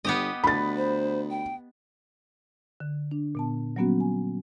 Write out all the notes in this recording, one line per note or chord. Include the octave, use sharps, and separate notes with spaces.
G1 B3 G4 D#5
D2 B5 A6
C5
G5
D3
D4
A#2 B3 A5
F#3 G3 A#3 B3 C#4 F#4
G#5